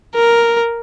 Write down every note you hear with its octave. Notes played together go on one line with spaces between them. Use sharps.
A#4